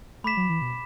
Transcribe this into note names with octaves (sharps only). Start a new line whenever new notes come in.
A3 B5 D6 B6 E7
F#3
E3
B2